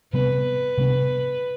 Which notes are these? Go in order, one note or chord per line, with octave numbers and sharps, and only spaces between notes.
C3 G3 B3 D4 B4
C3 G3 B3 D4